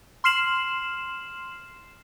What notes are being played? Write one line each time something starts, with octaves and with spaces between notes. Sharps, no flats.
C6 F6 C7 E7 F#7